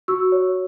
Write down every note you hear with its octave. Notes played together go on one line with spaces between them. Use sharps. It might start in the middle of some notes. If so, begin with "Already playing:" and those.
F#4 C#6 E6
C#5